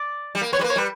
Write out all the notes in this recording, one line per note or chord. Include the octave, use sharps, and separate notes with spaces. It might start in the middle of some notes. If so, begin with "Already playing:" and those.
Already playing: D5
G3
A#3
B3 C#5
G3 B4
A#3
C#5
G3 B4